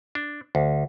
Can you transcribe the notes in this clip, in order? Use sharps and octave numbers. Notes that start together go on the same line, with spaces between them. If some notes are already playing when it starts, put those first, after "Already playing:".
D4
D2